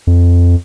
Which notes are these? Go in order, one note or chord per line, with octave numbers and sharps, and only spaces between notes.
F2